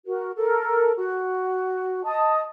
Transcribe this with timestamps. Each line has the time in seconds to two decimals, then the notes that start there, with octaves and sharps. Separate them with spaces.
0.06 F#4 A#4
0.37 A4 A#4
0.97 F#4
2.05 D#5 A5 D#6